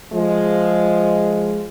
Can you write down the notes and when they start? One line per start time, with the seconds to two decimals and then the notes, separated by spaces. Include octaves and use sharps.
0.13 F3 G#3